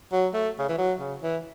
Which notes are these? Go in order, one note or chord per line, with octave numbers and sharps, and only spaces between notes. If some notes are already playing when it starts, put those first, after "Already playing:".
F#3
A3
C#3
E3
F#3
C#3
E3